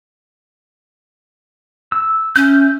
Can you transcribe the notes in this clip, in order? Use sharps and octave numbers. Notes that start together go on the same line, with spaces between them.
E6
C#4 E5 G6